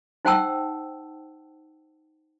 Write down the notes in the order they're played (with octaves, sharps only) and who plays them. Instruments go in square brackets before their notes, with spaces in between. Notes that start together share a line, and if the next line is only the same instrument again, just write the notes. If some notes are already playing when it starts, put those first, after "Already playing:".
[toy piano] D#4 C5 F#5 G5 A5 E6